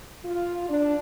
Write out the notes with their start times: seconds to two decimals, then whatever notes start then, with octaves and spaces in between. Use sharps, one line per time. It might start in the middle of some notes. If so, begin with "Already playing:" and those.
0.25 F4
0.69 D4